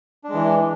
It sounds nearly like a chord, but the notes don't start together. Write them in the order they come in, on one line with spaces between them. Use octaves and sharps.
D4 G#3 E3